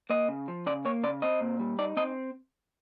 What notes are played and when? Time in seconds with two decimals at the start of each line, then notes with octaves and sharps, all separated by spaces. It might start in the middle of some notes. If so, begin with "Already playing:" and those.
0.10 A#3 D#5
0.28 C#3
0.48 F3
0.66 C#3 D5
0.85 A#3 C#5
1.03 C#3 D5
1.22 C4 D#5
1.41 A#2
1.59 G3
1.79 D#4 D5
1.97 C4 D#5